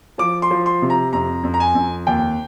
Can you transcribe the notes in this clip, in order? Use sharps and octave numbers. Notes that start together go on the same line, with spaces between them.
F3 D6
C6
F3
C6
C3
A#5
F2 A#5
F2
A#5
G#5
F2
D#2 G5